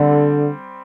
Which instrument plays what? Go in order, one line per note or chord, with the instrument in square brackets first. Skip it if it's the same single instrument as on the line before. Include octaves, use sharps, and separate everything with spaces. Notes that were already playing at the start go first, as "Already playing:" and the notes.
Already playing: [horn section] D3 [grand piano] G3 C4